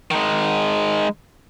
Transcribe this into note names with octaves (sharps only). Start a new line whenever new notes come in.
D#3 G#3